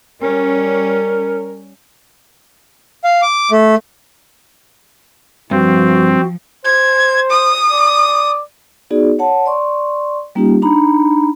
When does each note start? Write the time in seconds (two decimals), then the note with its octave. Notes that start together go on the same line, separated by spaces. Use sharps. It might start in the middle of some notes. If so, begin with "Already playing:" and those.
0.22 G3 C#4 A#4
3.04 F5
3.22 D6
3.51 A3
5.51 G2 F3 C4 F#4
6.65 C5 G#6
7.31 D#6
7.71 D5
8.91 B3 D#4 F#4 G#4 D5
9.19 C#5 F#5 A5
9.46 D5 C6 C#6
10.35 G3 A#3 C#4 D#4 F4 G4
10.62 D4 D#4 A#5 B5